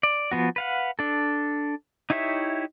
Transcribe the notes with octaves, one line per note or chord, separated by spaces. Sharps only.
D5
F3 B3 F#4
B4 F5 F#5
D4 A4
D#4 E4 G4 C#5 E5